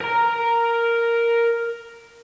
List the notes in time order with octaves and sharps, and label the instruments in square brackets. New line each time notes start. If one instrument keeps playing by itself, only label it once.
[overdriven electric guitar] A#4 A#5